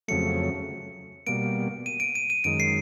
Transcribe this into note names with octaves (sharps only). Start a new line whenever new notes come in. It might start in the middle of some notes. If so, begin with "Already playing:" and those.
F2 C#3 F#3 A3 C#7
B2 G3 A#3 D7
D#7
D7
D#7
D#7
F#2 D#3 G#3 D7
C7